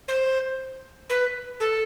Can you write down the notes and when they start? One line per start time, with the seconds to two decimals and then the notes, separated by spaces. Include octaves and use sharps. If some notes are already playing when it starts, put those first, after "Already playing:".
0.08 C5
1.10 B4
1.60 A4